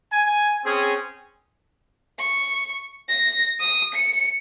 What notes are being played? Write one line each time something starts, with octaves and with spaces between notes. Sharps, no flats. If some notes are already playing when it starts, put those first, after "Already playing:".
G#5
C4 C#4 G#4
C#6
A#6
D#6
C#7